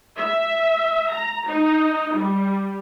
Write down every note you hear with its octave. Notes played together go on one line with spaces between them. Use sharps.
E5
A#5
D#4
G3